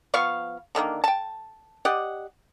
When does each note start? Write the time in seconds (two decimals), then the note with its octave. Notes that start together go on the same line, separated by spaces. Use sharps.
0.14 F3 B3 F5 C#6
0.75 D3 D#3 G#3 A#3
1.04 G5 A5
1.85 G4 D5 D#5 F#5